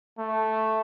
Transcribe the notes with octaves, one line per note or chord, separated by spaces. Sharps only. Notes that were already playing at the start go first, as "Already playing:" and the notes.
A3